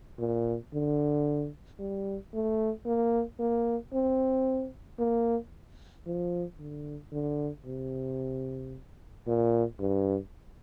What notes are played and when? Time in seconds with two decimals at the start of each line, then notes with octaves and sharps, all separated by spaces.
0.19 A#2
0.73 D3
1.79 G3
2.33 A3
2.86 A#3
3.39 A#3
3.93 C4
4.99 A#3
6.06 F3
6.59 D3
7.12 D3
7.66 C3
9.27 A#2
9.79 G2